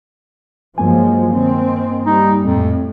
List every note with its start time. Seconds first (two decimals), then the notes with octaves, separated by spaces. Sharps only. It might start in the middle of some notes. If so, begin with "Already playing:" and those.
0.78 G2 F3 F#3 G#3 A#3 G#5
1.33 D#3 C4
2.06 G3 D#4
2.42 F2 A2